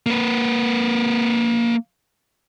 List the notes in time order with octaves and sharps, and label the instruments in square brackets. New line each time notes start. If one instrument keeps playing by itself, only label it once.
[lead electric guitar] A#3 B4